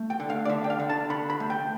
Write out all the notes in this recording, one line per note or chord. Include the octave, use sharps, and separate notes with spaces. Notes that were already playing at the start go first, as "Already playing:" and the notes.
Already playing: A3
G5
D3
F5
D5
D3 E5
G5
F5
D3
A5
D3 B5
B5
A3
G5